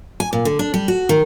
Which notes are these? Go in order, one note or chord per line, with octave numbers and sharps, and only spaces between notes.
G#5
A#2
D3
D4
G3
F#4
D#3